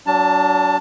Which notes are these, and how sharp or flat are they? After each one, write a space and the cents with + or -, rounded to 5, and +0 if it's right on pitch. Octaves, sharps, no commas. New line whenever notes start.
F#3 +20 D4 -25 A5 +15